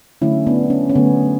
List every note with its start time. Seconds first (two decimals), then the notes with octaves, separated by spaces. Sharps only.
0.22 D3 F#3 A3 C#4 E4
0.47 B3 D4
0.70 C#4
0.89 C#4
0.95 D3 F#3 A3 B3